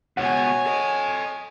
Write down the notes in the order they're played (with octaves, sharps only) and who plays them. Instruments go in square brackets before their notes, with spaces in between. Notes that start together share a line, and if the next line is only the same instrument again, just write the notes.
[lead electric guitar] C#2 B2 [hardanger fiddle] C#5 G#5 [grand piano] F#5
[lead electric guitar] A4 D#5